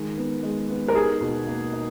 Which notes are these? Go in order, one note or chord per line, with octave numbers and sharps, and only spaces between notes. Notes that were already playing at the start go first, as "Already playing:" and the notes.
Already playing: D#3 G#3
B3
G#3
B3
A#4
D#4 G#4
B2
A#3
D#4